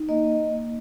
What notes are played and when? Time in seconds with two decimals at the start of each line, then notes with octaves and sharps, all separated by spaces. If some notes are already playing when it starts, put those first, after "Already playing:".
Already playing: D#4
0.09 A#3 D#5